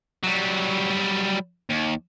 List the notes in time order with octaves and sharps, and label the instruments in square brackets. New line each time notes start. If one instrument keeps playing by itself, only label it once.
[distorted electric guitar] F#3 G3
D#2